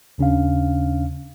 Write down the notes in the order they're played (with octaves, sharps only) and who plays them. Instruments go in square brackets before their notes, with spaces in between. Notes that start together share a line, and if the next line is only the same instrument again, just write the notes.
[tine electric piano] D#2 C#3 C#4 D4 F5